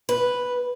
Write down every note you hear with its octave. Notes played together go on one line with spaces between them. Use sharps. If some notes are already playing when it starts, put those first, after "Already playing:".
B4